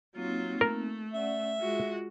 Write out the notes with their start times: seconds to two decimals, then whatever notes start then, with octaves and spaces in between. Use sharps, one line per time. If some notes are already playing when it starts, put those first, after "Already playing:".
0.16 F#3 A#3 C4 D#4 F4
0.61 A3 A#4
1.14 C#4 D5 E5 F#5
1.60 G#3 F4 F#4